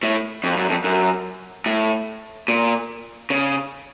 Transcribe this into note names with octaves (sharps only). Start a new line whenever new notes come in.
A2
F2
F#2
F2
F#2
A2
A#2
C#3